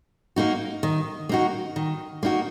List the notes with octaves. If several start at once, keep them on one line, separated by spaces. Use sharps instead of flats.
A#3 D#4 F#4
D#3
A#3 D#4 F#4
D#3
A#3 D#4 F#4